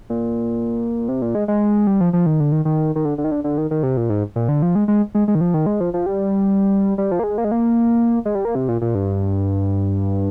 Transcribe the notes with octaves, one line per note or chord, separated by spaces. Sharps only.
A#2
C3
A#2
G#3
G#3
G3
F3
F3
D#3
D3
D#3
D#3
D#3
D3
D3
D#3
D3
D3
D#3
D#3
C3
A#2
G#2
A#2
D3
F3
G#3
G#3
G#3
G#3
D#3
F3
D#3
G#3
F3
F3
G3
G3
F3
A#3
G#3
A#3
G#3
A#3
G#3
G3
A#3
C3
A#2
A#2
G2